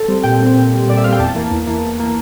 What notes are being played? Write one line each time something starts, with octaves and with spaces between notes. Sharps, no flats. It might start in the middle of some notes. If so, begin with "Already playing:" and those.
Already playing: A4
G3 C4
A#2 G5
G3 C4
A#2
G3 C4
A#2 D5
E5
G3 C4 F5 G5
E2 A5
E3 A#3
E2
E3 A#3
E2
E3 A#3